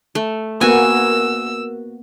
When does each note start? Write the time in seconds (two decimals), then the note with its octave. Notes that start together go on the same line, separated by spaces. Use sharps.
0.15 A3
0.61 A#3 B3 F#4 G#5 E6